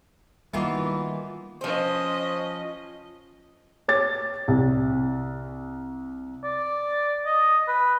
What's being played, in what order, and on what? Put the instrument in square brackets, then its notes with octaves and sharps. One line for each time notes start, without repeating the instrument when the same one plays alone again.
[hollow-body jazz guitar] D#3 A#3 D#4 [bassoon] E3 [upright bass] G3 [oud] B3 F4 F#4
[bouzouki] F3 C5 [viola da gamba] C#4 D#5
[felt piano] C#5 D6 A6
C2
[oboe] D5
D#5
B4